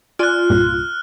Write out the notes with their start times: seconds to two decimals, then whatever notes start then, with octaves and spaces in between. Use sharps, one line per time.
0.19 F4 D5 G#5 F6 F#6
0.50 C2 G2 A#2